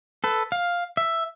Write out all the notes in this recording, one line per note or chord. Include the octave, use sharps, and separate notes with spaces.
A4 B4
F5
E5